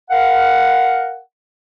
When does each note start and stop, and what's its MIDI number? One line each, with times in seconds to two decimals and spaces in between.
0.11 1.19 70
0.11 1.19 77
0.11 1.19 78